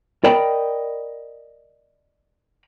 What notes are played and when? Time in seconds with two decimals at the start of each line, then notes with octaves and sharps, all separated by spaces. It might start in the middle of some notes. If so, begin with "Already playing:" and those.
0.24 A#4 D5 D#5 G5 B5